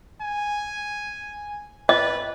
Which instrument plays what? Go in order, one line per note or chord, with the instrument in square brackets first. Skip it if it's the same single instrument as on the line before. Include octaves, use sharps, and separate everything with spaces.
[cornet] G#5
[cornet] B4 [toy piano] D#5